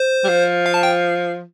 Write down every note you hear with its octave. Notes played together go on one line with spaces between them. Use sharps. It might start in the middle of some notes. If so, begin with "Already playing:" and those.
Already playing: C5
G3
F3
F5
A5
G5